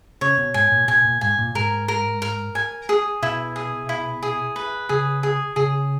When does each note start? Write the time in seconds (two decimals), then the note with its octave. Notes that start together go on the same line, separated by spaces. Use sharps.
0.21 C#3 C#5
0.38 B2
0.54 G#2 G#5
0.72 A#2
0.88 B2 G#5
1.04 A#2
1.21 G#2 G#5
1.38 A#2
1.55 G#2 A#4
1.88 A#4
2.22 A#4
2.55 G#5
2.89 G#4
3.22 B2 E4
3.56 G#4
3.89 E4
4.23 G#4
4.56 B4
4.89 C#3 G#4
5.23 G#4
5.56 C#3 G#4